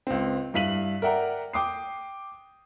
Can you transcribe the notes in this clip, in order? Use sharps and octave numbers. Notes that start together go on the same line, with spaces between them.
C#2 C4
G2 E4 F5 B6 D#7 F#7
A#4 D5 E5 F#5 G5 A#5
G5 D6 D#6 C7